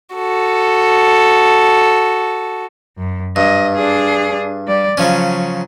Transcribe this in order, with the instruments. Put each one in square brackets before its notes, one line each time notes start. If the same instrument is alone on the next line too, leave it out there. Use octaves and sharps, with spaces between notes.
[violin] F#4 A4
[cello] F#2
[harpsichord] G2 [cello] D#5
[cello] D4 G#4
G3 D5
[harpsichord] C#3 F3 C#4 [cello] F#3